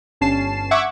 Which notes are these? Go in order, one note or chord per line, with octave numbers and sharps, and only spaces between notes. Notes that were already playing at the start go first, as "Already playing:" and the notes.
G1 G2 C#4 A5 C7 E7
E5 F#5 C#6 D6 E6 G#6